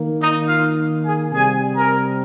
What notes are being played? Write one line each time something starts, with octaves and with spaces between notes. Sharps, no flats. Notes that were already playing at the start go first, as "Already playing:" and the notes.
Already playing: D#3 A#3
D#4 D#5
F4 F5
G#4 G#5
C3 G3 C4 G#4 G#5
A#4 A#5